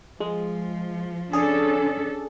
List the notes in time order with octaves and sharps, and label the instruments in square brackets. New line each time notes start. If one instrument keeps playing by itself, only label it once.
[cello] F3 [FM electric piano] G#3
[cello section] C#4 D4 A4 [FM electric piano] G#4